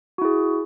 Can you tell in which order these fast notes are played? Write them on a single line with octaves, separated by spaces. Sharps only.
F#4 E4 G#4